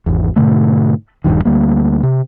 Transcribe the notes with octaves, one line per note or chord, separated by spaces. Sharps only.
G#1 E2
G#2 B2 D3 A3
D#1 G#1 G2 D#3
D2 G3 A#3
C3